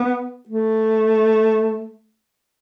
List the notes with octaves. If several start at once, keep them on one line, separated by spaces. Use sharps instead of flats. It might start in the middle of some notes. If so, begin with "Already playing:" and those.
Already playing: B3
A3